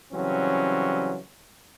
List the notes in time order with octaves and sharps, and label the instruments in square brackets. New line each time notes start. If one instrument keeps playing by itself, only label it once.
[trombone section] C#3 E3 F#3 G3 C4 C#4